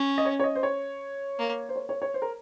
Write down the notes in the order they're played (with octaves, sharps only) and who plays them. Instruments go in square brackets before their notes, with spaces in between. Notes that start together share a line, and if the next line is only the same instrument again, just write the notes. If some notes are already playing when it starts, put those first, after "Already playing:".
Already playing: [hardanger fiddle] C#4
[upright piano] D#5
C#5
C#5
D#5
C5
C#5
[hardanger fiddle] A#3
[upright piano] C5
C#5
C#5
C#5
C5
A#4